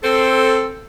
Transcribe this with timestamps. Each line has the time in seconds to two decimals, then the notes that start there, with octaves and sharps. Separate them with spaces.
0.03 C4 A4